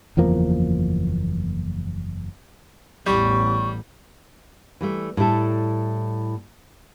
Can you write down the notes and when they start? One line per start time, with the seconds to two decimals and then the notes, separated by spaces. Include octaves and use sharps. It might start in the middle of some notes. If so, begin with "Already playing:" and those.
0.17 F#1 E2 F3 A#3
3.06 A1 E2 A2 G3 C#6
4.81 E3 G3 A3
5.17 A2 G3 E4 A4